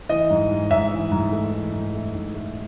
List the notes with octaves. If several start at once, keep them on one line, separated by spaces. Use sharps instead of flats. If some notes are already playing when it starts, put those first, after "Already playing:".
E3 D#5
G#2
G#2
G#2 E5
E3
G#2
A3
E3
G#2
A3
G#2
A3